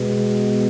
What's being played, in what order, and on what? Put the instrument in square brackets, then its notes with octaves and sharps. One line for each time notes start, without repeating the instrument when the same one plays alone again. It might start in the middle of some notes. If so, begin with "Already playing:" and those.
Already playing: [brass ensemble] B2 G#3 B3